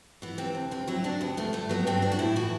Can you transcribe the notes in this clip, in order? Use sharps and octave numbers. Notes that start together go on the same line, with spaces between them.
E3 B3
C3 C4
D2
D2 C4
F#3 E4
C3 D4
D2 B3
D2 A3
G2 A3
F#3 B3
G2 C4
F#3 D4
F#4
A2 E4
E3 F#4